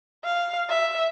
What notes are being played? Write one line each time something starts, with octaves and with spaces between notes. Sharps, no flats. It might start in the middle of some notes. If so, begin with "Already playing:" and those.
F5
E5